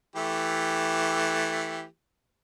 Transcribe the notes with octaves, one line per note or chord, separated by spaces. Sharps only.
E3 A3 G4